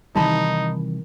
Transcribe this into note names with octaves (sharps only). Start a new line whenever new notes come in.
C3 D#3 E3 G3 D#4 A5 B5